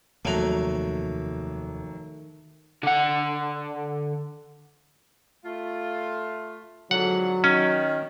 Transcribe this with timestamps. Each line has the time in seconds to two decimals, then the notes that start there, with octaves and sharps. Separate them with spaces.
0.25 F1 D#2 C3 D#3 F#3 A3 F#4 F7
2.83 D3 F#5
5.44 A3 F4
6.91 F2 G#2 D3 F#3 F#5
7.44 D#3 C#4